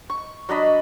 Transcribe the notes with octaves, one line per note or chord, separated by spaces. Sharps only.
C#6
F#3 D4 D#5 B5